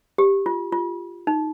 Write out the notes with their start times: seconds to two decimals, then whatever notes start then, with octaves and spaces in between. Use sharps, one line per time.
0.18 G4
0.46 F4
0.72 F4
1.27 D#4